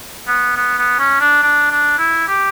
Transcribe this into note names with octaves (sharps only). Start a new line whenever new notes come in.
B3
B3
B3
C#4
D4
D4
D4
E4
G4